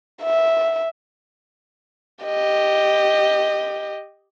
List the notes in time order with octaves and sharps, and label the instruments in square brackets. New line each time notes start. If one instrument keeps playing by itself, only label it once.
[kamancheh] E5
G4 D#5